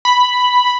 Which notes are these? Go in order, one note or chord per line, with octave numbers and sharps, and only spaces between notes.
B5